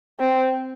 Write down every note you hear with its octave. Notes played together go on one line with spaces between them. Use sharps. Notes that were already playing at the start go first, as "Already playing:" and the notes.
C4